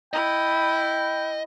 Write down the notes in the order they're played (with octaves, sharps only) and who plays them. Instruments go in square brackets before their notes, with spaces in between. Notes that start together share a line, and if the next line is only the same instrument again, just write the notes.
[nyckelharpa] E4 B5 [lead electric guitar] D#5 [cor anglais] G5